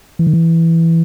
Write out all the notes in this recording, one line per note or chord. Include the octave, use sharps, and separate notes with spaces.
E3
D#3
E3